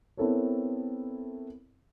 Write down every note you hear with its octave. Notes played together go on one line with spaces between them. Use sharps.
B3 C4 E4 A4 A#4 C#5